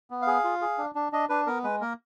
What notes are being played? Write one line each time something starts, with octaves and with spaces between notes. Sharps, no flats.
B3
F5
G#4
F4
G#4
D4
D4
D4 D#5
D4 B4
B3 A#4
G#3 B4
A#3 A#4